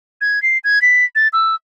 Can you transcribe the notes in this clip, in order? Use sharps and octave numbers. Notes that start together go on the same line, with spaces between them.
G#6
C7
G#6
B6
A6
E6